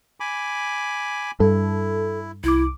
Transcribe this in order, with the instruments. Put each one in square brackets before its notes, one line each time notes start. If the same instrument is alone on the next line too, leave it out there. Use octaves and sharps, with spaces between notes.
[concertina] G#5 B5 D6
[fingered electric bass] G2 [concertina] E4 [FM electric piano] A4
[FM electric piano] C2 D6 [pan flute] E4